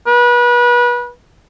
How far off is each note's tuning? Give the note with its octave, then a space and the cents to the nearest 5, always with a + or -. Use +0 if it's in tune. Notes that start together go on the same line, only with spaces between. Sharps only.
B4 -30